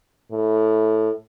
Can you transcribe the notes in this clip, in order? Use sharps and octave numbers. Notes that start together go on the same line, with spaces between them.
A2